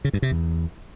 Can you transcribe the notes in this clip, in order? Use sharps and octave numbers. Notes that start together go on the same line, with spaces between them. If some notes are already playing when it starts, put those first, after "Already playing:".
C#3
G2
C3
E2